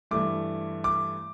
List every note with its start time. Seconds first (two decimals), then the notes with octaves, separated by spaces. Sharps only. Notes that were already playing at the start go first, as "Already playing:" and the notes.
0.11 G2 E3 A3 D6
0.84 D6